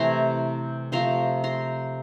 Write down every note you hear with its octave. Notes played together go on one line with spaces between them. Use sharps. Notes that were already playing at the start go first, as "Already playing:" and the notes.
Already playing: C3 E3 A3 A#5 C6
C3 F3 A3 A#5 C6
A#5 C6